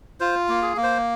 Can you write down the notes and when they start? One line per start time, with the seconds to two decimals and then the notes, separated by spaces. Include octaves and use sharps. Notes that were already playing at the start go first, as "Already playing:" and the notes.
0.20 F4 C5
0.49 A#3
0.62 G#4
0.77 A#3
0.83 C5